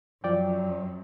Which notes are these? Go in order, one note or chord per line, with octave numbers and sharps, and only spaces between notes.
F#2 F3 D5 G5